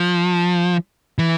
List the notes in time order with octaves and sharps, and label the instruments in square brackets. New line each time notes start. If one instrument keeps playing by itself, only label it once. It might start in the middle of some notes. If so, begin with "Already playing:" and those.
Already playing: [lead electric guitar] F3
E3